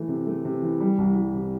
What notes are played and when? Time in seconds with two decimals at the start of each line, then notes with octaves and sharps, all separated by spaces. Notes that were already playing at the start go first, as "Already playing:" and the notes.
Already playing: E3 A3
0.08 C3
0.27 A3
0.45 C3
0.62 E3
0.80 G3
0.98 C2
1.15 G3
1.34 C3